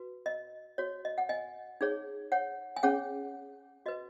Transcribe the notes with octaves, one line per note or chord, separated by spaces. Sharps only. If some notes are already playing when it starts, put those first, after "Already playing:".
Already playing: F#4 B4
D#5
F#4 C#5
D#5
F#5
D#5 G#5
D#4 G#4 C#5
C#5 F#5
G#5
C#4 G#4 C#5 F#5
F#4 B4 D#5